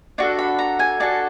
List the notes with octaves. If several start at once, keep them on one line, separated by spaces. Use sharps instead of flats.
D4 F#4 A4 A5
B5
A#5
G#5
D4 F#4 A4 A5